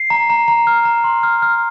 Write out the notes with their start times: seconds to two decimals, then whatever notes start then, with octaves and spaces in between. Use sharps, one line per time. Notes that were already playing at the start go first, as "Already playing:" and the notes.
Already playing: C7
0.10 A#5
0.30 A#5
0.48 A#5
0.67 F6
0.85 A#5
1.04 C6
1.23 F6
1.42 F6